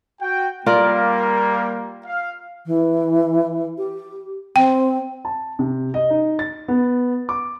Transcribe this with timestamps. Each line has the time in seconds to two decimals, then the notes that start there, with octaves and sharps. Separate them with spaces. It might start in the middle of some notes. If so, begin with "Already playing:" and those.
0.21 F#4 G5
0.66 G3 A#3 F4 A#4 D5
2.06 F5
2.66 E3
3.78 G4
4.56 C4 G5
5.25 A5
5.59 C3
5.94 D#5
6.10 D#4
6.39 A6
6.68 B3
7.29 D6